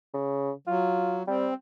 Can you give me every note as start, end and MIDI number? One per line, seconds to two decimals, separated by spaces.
0.14 0.51 49
0.67 1.23 54
0.67 1.22 65
1.27 1.49 55
1.27 1.54 60